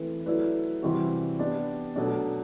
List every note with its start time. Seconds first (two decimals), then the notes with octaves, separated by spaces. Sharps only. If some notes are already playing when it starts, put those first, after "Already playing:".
Already playing: E3 A3 C4 E4 B4
0.26 F#3 A3 E4 B4 D5
0.82 C3 E3 G3 C4 F#4
1.39 B3 D4 G4 D5
1.96 B2 F#3 A3 D4